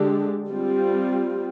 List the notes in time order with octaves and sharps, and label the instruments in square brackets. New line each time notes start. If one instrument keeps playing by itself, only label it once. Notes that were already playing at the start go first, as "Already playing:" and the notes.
Already playing: [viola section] D3 G#3 D4 G4
G3 C4 F4